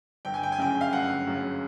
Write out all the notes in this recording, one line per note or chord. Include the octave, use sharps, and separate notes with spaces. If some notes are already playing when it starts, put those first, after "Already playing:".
G1 G5
G#5
G5
G#5
F#2 C#3 G5
F5
G1 F#5
F#2 C#3